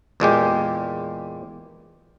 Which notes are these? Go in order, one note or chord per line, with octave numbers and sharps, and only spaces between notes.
E2 A#2 G#3 G4